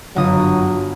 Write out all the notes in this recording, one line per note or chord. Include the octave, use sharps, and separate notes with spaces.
G1 F#2 F#3 F4 F#5 D#6